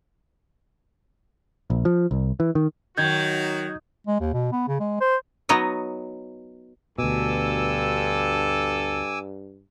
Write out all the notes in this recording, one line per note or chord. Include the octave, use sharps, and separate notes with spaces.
A#1
F3
C2
E3
D#3
D#3 F#3 D#4 F#4 G6 G#6
G#3
D#2
B2
B3
C#3
G#3
C5
F#3 B3 D#4 C#5 D#5
D2 G2 B2 A4 G#5 D6 E6